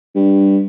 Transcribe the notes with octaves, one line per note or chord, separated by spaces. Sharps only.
G2